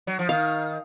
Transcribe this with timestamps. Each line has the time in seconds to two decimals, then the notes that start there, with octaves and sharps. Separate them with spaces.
0.07 F#3
0.19 F3
0.29 D#3 F5